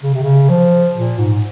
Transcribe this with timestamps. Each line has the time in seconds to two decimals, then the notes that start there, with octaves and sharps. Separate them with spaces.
0.03 C#3
0.13 C3
0.22 C#3
0.49 F3
0.96 A#2
1.18 G#2